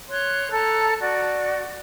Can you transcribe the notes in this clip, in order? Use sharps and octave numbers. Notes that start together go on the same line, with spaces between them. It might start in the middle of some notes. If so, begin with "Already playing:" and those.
C#5 C6 F#6
A4 A5 A#5
F#4 D5